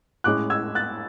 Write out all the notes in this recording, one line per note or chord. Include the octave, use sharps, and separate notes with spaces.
A2 G#3 C#4 D6 F#6
E6 G#6
F#6 A6